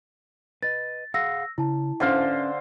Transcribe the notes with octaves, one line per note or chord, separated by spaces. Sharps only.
B4 D#5 A6
G#4 F5 F#5 E6 A#6
C#3 E4 A5
D3 C#4 B4 C5 E5 F5